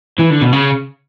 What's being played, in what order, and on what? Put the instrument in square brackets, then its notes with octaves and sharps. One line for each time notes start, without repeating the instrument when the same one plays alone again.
[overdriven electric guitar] E3
D3
B2
C#3